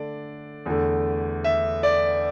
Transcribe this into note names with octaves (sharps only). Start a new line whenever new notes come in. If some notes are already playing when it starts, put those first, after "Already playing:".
Already playing: D3 A3 D4 D5
E2 D3 A3
E5
D5